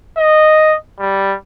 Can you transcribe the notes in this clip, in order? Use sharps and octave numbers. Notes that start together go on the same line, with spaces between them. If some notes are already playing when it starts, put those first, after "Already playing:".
D#5
G3